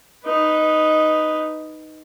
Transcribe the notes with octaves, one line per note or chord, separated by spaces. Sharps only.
D#4 B4